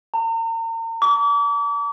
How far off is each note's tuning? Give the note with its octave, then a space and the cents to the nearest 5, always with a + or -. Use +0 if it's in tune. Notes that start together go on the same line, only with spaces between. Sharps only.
A#5 -40
D6 -40